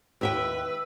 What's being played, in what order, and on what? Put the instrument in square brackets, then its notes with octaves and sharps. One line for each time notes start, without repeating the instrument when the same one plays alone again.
[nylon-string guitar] D#2 E5 G5 [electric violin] B4 [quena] E6